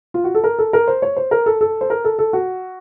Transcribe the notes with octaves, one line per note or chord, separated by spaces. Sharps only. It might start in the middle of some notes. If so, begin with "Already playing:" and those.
F4
F#4
A4
A#4
A4
A#4
C5
C#5
C5
A#4
A4
A4
C5
A#4
A4
A4
F#4